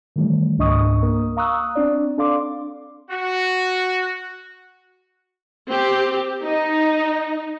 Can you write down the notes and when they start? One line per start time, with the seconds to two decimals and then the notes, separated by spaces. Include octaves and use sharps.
0.16 D#3 E3 G3 A3
0.58 C#2 G#2 D4 D#5 C#6 D#6
1.02 A#3 A#4
1.37 F5 A#5 C#6 D#6 E6 F#6
1.75 C4 D4 D5
2.18 D4 A4 D5 F5 C6 D6
3.11 F#4
5.68 C4 G4
6.42 D#4